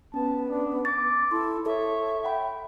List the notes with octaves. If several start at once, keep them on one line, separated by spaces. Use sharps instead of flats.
B3 C#4 A5
D4
D6 A6
E4 A4 C6
A4 C#5 E5
F#5 G5 B5